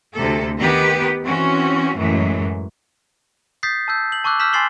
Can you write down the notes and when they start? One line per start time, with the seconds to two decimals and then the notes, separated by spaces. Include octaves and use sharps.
0.15 D2 C3 A4
0.59 D#3 B3 G4 B4
1.25 E3 C4 C#4 F#4
1.96 F#2 A2 E3 F#3 G#3
3.63 D#6 G6 A6 B6 C7
3.88 A5 E6 G6
4.12 F#7
4.24 A5 C#6 D6 E6 F#6
4.39 E6 F6 G6 B6 E7 F#7
4.53 G#5 C6 A6 C7 F#7 G7